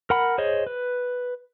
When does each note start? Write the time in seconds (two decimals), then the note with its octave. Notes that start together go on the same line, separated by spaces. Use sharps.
0.10 A#4 F#5 B5
0.38 G#4 C5 C#5 D#5
0.67 B4